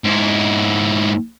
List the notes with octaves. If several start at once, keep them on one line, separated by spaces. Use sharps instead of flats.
G#2 E4